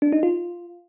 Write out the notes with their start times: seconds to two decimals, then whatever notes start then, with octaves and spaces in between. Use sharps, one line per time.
0.02 D4
0.13 D#4
0.23 F4